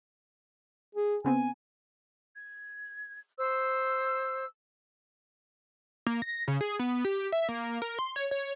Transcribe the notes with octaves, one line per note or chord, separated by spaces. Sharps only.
G#4
C#3 B3 C4 G#5
G#6
C5 E6
A#3
A#6
C#3
G#4
B3
G4
E5
A#3
A#4
C6
C#5
C#5